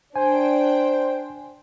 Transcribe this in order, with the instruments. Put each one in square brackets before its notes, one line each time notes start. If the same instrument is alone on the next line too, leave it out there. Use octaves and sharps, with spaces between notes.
[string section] D4 G5 [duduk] C5 [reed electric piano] G#5